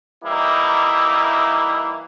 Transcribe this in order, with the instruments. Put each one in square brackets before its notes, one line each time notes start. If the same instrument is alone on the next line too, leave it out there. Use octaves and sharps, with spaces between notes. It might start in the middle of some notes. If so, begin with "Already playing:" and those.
[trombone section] E3 G3 A#3 D#4 E4